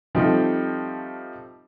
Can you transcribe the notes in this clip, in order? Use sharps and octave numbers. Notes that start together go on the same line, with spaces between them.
F3 G3 A3 C4 D#4